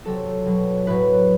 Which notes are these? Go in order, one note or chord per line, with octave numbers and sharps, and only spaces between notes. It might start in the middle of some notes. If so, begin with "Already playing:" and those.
C3 F#3 A4
B2 F#3
A2 F#3 B4